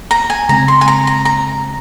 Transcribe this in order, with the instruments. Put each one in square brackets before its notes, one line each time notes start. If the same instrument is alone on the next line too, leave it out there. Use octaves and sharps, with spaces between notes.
[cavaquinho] A#5
G#5
[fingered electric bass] C#3 G#3 C4 [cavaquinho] A#5
[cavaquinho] C6
G#5
A#5
A#5
A#5